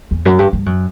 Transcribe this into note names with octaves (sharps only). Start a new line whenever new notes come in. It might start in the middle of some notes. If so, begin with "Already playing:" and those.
E2
F#2
G2
G2
F#2